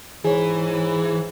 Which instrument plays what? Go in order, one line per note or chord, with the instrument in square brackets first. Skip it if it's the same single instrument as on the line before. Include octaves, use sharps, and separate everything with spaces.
[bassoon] G#2 [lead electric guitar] E3 [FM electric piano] G#4 C#5